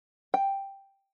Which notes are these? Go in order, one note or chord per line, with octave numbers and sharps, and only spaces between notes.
G5